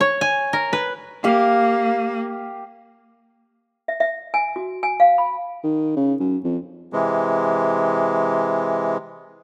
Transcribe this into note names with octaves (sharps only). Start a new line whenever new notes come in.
C#5
G#5
A#4
B4
A#3 G4 F5
E5
E5
G#5
F#4
G#5
F5
B5
D#3
C#3
F#2
F2
C3 E3 G#3